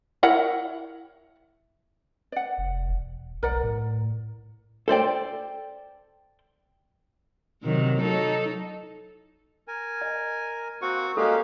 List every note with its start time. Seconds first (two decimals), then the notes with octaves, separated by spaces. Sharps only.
0.23 E4 A#4 F#5
2.32 D5 F#5
2.58 F1
2.89 E1
3.43 B1 A#4 D5 F#5
3.63 A2
4.88 A4 C5 D5 G5
7.63 C3 D#3 F#3
8.01 F#3 D#4 A4
9.68 A#4 G#5
10.02 D#5
10.82 A#3 C4 F#4 F#5 C#6
11.17 G#3 A#3 C#4 F#4 G4 A4 F5